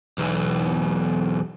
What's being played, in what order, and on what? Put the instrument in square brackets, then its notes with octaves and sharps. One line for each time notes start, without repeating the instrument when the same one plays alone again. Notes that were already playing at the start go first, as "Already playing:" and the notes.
[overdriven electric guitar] B1 E2